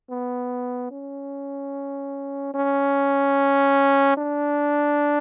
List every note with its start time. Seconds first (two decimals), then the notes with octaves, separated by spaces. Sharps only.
0.10 B3
0.91 C#4
2.54 C#4
4.17 D4